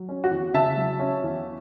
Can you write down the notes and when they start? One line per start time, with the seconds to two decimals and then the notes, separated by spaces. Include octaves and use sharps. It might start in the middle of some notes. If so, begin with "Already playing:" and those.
Already playing: F#3
0.09 C#4
0.24 F#4
0.31 E2
0.54 C#3 E5 A5
0.77 F#3
0.99 C#4
1.23 E2